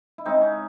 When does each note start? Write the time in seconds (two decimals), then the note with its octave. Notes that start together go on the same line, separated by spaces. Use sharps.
0.18 E4
0.26 C#3 G#3 C4 D#4
0.41 C#4